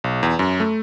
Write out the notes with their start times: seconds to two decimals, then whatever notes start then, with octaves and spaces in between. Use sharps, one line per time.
0.04 B1
0.23 E2
0.39 F#2
0.60 A3